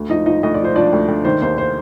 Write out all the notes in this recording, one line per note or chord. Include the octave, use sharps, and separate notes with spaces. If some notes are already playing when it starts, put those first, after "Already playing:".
Already playing: D2
F3 D#4 D#5
F3 D#4 D#5
D2 D#5
D5
F3 C5
F3 D4 D5
D2
D2
D#3 C5
D#2 C5
C5